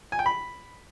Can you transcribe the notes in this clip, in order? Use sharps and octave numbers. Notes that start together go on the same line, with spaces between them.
G#5
G5
B5